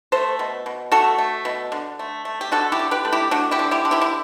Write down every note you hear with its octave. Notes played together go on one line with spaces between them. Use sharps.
A3 A4 C5
B2
B2
A3 F#4 A4
A3
B2
D3
A3
A3
G4
D3 F#4 A4
E4 G4
D3
G4 B4
A3
E4 G4
A3 D4 F#4
E4 G4
D3
E4 G4
D3
E4 G4
E4